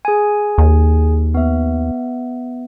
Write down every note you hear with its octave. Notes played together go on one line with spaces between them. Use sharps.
G#4 G#5
D#2
B3 E5